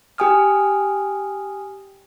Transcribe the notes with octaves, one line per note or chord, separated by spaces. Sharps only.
G4 G5 G#5 D#6 F6